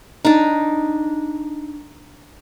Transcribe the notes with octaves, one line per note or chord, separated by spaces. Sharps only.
D4 D#4